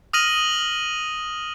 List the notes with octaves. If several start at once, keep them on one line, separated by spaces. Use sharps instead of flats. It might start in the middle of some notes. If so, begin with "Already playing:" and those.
D#6 F6 A#6 D#7 F#7